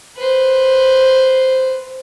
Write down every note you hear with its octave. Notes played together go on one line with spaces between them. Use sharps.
B4 C5